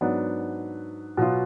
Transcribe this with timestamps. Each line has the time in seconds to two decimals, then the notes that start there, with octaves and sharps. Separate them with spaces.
0.01 G#2 F#3 B3 D4
1.17 B2 F#3 B3 F4